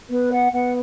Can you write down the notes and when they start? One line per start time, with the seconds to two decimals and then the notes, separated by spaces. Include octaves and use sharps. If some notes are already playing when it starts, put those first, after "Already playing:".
0.09 B3 B4
0.31 F#5
0.52 B3 F#5